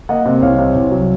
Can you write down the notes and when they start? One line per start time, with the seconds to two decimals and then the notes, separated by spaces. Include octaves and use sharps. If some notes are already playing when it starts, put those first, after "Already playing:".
0.09 A#3 D#5 F#5
0.26 C3
0.42 C2 C#5 F5
0.59 C3
0.75 C2
0.92 F#3